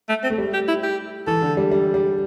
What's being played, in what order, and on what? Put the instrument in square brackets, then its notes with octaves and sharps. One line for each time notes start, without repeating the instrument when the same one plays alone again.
[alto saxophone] A3
C4
[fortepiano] A3
G3
[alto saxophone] G4
E4
G4
[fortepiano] E3 [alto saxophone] A4
[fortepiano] D3
G3
G3
G3